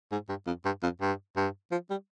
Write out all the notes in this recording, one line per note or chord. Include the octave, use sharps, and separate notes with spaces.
G#2
G2
F2
G2
F2
G2
G2
F3
G3